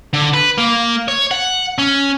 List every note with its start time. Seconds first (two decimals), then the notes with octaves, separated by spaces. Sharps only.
0.13 D3
0.34 B4
0.58 A#3
1.08 C#5
1.31 F#5
1.78 C#4